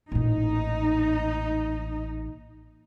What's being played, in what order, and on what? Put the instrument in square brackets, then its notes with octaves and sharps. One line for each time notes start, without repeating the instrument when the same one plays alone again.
[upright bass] A1 A#2 [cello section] D#4